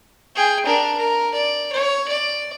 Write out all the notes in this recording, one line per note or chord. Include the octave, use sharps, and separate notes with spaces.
G#4 G5
D4 A#4
A#4
D5
C#5
D5